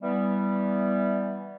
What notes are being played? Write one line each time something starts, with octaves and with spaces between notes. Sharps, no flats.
E3 G3 B3